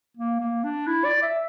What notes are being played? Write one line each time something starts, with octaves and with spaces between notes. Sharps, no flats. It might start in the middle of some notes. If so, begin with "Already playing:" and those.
A#3
A#3
D4
E4
D5
E5